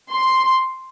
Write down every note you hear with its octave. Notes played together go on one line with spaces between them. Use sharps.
C6